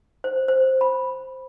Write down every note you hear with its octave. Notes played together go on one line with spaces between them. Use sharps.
C5
C5
B5